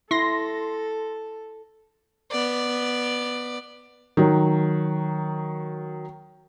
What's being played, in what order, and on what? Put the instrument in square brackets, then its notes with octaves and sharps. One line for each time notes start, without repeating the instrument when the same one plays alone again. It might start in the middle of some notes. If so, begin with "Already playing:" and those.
[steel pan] E4 [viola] A4 [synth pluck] C6 A#6
[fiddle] B3 D5
[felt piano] D#3 F#3